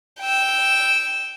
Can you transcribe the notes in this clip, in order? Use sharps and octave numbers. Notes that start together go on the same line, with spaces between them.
G5 E6